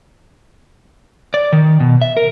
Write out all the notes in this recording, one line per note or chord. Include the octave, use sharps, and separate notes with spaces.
D5
D#3
B2
E5
A#4